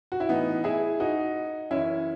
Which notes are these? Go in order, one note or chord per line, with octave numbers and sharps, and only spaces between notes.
F#4
E4
A2 E3 B3 D#4
E4 G#4
D#4 F#4
F#2 E3 C#4 E4